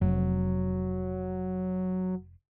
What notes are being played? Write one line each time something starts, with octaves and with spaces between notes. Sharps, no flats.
F1 F#3